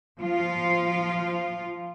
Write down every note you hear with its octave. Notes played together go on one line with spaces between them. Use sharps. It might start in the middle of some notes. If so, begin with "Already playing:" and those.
F3 F4